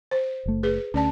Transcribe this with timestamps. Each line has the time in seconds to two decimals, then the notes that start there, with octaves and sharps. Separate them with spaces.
0.11 C5
0.46 F#1 A3
0.63 G#4 B4
0.94 D2 C#4 D5 A5